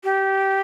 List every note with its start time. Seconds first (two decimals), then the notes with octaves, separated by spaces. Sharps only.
0.03 G4